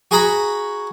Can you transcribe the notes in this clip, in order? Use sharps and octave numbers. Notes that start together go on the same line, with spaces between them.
F#4 G#4 F#5 A#5 B5